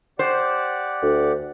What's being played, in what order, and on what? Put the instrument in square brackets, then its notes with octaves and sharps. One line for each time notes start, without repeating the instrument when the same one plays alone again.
[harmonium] G4 D5 F#5 [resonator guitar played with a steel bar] C5
[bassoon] D2